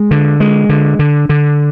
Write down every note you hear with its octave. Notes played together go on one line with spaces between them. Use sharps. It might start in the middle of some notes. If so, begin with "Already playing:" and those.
Already playing: G#3
D3
G#3
D3
D3
D3